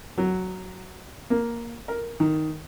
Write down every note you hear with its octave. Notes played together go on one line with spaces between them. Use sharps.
F#3
A#3
A#4
D#3